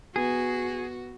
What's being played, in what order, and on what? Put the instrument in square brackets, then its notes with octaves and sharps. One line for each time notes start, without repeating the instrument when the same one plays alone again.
[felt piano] B3 [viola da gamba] F#4 [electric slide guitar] G#4